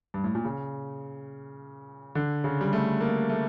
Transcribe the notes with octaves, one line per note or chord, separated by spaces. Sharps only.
G2
A2
A#2
C#3
D3
C#3
G3
A3
A#3
A3